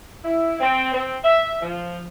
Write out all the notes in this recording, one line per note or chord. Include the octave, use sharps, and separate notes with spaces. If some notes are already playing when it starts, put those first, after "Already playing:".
E4
C4
C4
E5
F3